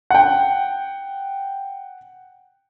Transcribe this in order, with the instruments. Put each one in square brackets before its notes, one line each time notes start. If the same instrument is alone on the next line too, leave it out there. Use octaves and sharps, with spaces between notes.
[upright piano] F#5 G5